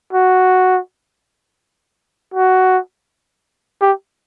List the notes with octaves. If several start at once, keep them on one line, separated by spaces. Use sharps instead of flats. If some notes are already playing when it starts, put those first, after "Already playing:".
F#4
F#4
G4